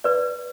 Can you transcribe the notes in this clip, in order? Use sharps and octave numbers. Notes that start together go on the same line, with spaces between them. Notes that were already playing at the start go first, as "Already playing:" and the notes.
B4 D5